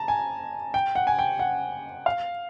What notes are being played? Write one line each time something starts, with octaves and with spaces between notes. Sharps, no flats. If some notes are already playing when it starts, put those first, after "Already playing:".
Already playing: A5 A#5
G#5
G5
F#5
G#5
G5
F#5
F5